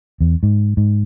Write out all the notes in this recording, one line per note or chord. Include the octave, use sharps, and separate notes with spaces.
E2
G#2
G#2